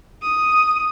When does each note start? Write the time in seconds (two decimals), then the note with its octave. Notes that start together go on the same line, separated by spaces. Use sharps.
0.22 D#6